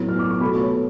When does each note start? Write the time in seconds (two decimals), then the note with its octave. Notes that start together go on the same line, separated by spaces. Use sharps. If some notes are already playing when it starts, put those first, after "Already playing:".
Already playing: A2 F#3 B3
0.09 F6
0.19 D6
0.30 C#6
0.41 B2 A3 B5
0.60 C#5